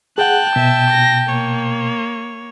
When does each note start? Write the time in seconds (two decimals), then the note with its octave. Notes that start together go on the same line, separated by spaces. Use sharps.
0.18 G#4 F#5 G5 A5 F#6
0.56 B2 E5
0.91 A#6
1.29 A#3 C#5